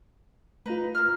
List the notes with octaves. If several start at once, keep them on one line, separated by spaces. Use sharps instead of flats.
A3 D#4 F4 B4
A#3 F6